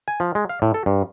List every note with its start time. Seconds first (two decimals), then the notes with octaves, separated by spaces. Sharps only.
0.08 G#5
0.20 F3
0.35 G#3
0.49 F5
0.62 A2
0.74 A4
0.86 G2